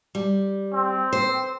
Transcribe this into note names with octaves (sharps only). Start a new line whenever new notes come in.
G3
C4
C5